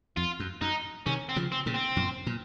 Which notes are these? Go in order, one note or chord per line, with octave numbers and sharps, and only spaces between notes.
F2 F4
F#2
F#2 D#4
C3 D#3 C#4
C4
C#3 F3
C4
A#2 C#3
C4
F#2 A#2
A#2